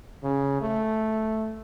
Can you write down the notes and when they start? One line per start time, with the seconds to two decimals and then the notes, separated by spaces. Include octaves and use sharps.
0.24 C#3
0.62 A3